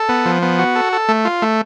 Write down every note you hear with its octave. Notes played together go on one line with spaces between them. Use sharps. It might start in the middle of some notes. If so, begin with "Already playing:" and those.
Already playing: A4
B3
F3
B3
F#4
A4
A4
A3
F4
A3